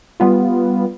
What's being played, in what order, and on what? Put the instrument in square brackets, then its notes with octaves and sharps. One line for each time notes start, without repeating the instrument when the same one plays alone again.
[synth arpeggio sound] G3 B3 F4